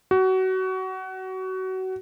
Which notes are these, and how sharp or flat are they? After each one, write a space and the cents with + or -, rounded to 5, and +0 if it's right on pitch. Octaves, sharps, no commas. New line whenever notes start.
F#4 +25